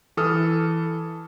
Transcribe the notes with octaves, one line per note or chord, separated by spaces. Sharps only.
E3 A4 D#6 F6